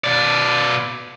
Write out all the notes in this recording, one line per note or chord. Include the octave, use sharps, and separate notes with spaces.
B2 D5